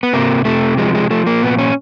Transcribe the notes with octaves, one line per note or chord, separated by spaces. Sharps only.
B3
C3 A#3
C3 A3
F3 G#3
G#3
F3 A3
A#3
A#2 B3
C#4